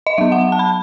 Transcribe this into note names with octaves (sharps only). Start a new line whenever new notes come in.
D#5
F#3 B3 E5
F#5
A5
B5